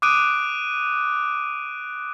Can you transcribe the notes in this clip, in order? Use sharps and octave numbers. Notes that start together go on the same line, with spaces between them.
D6 D#6 F#6 D7 D#7